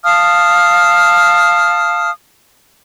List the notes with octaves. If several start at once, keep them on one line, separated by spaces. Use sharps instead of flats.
F5 A5 D#6 F6